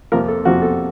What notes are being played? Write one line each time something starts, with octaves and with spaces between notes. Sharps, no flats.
F2 C3 F3 A#3 A#4
A4
F2 C3 F3 A#3 F#4
A4